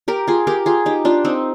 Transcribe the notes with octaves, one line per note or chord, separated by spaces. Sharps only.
G4 A#4
F4 G#4
G4 A#4
F4 G#4
D#4 G4
D4 F4
C4 D#4